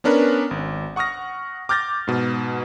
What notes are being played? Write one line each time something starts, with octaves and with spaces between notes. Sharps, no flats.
B3 C#4 D4 A#4 B4
G#1
F#5 C#6 D#6 F6 A#6
D6 F6 G6 A6 A#6
G#2 B2